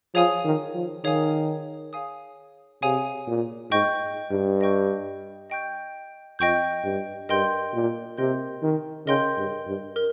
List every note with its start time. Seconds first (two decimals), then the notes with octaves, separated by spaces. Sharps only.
0.14 F3 G#4 C#5 F5 G#5 D#6
0.45 D#3
0.75 F3
1.04 D#3 G#4 C#5 F5 G#5 D#6
1.93 G#4 C#5 F5 G#5 D#6
2.82 C3 G#4 C#5 F5 G#5 D#6
3.27 A#2
3.71 G#2 D#5 G5 C#6 G6
4.31 G2
4.61 D#5 G5 C#6 G6
5.50 D#5 G5 C#6 G6
6.39 F2 D#5 G5 C#6 G6
6.84 G2
7.29 G2 A#4 D#5 G5 C6 G6
7.74 A#2
8.18 C3 A#4 D#5 G5 C6 G6
8.63 D#3
9.07 C#3 A#4 D#5 G5 C6 G6
9.37 G2
9.67 G2
9.96 A#4